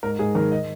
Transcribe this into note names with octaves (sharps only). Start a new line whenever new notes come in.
G#2 A#4
G#2 G#4
D#3 A#4
D#5